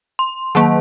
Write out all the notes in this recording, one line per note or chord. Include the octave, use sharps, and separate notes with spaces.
C6
D#3 F#3 A#3 A5